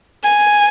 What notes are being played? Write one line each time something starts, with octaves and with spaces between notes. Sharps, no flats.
G#5